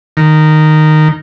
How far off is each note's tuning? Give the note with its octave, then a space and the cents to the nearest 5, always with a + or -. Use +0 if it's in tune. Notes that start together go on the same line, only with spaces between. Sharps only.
D#3 -10